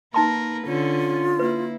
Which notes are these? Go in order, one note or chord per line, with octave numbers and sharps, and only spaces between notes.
A#3 D#4 A#4 B4 A5 C6
D3 C#4 F4
A#3 E4 B4